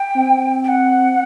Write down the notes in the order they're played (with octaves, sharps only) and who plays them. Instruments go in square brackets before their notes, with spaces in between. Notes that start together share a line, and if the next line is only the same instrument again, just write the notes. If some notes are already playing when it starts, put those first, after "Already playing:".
Already playing: [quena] G5
[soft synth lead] C4
[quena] G5
F#5